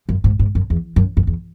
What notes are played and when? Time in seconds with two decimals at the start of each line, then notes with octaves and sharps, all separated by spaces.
0.09 F#2
0.24 G#2
0.39 G#2
0.55 F#2
0.70 E2
0.96 F#2
1.17 F#2
1.27 E2